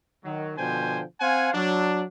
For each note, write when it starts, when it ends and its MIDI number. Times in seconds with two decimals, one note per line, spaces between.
0.25 0.53 51
0.25 0.53 54
0.58 1.02 47
0.58 1.02 50
0.58 1.02 53
0.58 1.02 72
0.58 1.02 79
0.58 1.02 80
1.21 1.53 60
1.21 1.53 72
1.21 1.53 77
1.21 1.53 78
1.21 1.53 80
1.54 2.04 54
1.54 2.04 62